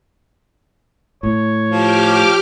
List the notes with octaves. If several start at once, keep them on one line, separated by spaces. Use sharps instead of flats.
A2 C#5
F3 G4 D6 F6